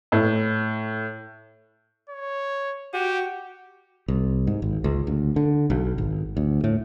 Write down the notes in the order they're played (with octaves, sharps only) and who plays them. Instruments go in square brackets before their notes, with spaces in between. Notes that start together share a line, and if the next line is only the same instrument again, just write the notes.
[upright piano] A2
[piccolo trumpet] C#5
[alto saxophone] F#4 [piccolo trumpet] G4
[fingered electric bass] C2
G#2
G#1
C#2
D2
D3
B1
G#1
D2
A2